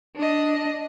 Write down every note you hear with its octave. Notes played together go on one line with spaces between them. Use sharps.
D4 D#5